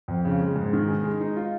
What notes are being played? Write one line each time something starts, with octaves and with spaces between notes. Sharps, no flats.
F2
C#3
G#3
G#2
D#3
G#4
G#3
D#4
F4